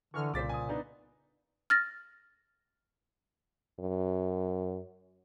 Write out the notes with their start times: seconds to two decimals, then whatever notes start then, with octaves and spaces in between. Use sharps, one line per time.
0.14 D3 E3 C#6 F6
0.34 C2 A#2 C#3 C5 D6 A6 B6
0.49 G#5 D#6
0.69 B3 D4 D#4
1.70 F6 A6 A#6
3.80 F#2